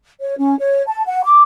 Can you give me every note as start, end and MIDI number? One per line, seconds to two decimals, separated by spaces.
0.20 0.36 73
0.36 0.57 61
0.58 0.82 73
0.87 1.02 81
1.06 1.21 78
1.23 1.42 86